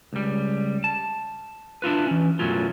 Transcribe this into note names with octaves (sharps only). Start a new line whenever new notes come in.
C#2 G3
A5
D4 E4 F4 B4
E3 C#4
B1 F#2 A2 F#3 C#4 F4